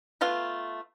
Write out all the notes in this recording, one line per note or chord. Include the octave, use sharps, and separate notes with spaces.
A3 B3 F4 F5